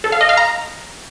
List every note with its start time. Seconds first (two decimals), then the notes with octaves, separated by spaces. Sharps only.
0.04 A4
0.12 F5
0.21 D#5
0.29 F5
0.37 A#5